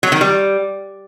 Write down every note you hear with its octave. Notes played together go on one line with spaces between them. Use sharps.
F#3
D#3
G3